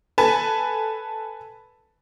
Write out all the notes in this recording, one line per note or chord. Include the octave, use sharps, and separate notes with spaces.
A4 B4 G#5 A5